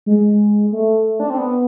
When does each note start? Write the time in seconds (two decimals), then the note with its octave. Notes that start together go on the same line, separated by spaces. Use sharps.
0.06 G#3
0.72 A3
1.20 D4
1.30 C4
1.38 B3